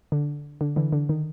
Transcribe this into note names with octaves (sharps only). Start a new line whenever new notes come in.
D3
D3
D3 E3
D3
D#3